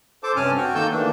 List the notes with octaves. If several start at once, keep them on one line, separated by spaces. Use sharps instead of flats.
A4 C5 A5 D6
G2 C3 C#4 G#5 A5 F6
F#4 G5 C#6
D#3 A#3 A4 A5 E6 G6
D#3 E3 A3 A#3 D4